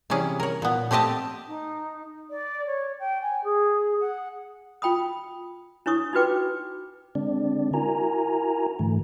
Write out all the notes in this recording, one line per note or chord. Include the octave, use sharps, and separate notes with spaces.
C3 E3 G3 C#4 G#4
A#4 C#5
A#2 B3
A3 C4 G4 D#5 A5
D#4
D5
C#5
G5
G#5
G#4
F#5
F4 G5 B5 D#6
D4 E4 C#5 C#6 D#6
D#4 F4 F#4 B4 G5 D6
D3 G#3 C4 D4 D5
E4 F#4 A#4 G#5 A#5
G#2 D3 E3 A3